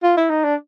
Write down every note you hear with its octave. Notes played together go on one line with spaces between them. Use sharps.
F4
E4
D#4
D4